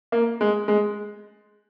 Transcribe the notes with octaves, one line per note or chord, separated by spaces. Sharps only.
A#3
G#3
G#3